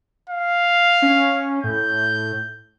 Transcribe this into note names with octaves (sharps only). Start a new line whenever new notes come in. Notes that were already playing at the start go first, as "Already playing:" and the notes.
F5
C#4
A2 G6